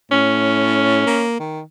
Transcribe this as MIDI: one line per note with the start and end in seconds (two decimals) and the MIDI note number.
0.12 1.05 45
0.12 1.24 61
1.06 1.38 58
1.40 1.62 51